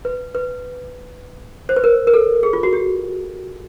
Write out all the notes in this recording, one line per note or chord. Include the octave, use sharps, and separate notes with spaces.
B4
B4
C5
B4
A#4
A#4
A4
G#4
F4
F#4
G4